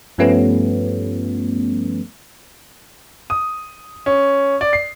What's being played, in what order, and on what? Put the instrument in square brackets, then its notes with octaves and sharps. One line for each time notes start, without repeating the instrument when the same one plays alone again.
[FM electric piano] G2 F3 G3 A3 B3 C#4
[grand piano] D#6
C#4
D5
C7